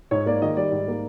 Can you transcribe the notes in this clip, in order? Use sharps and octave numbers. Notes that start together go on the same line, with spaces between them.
G#2 C#5
A#3 D5
D#3 D#5
G3 D5
G#2
A#3